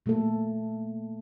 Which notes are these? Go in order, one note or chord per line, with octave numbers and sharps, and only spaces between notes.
A#2 A3 A#3 A4